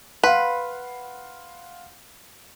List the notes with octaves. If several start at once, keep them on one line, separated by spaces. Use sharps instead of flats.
B4 F5 F#5 C6